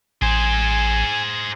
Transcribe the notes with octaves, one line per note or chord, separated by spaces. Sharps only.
A1 G#4 C5 G#5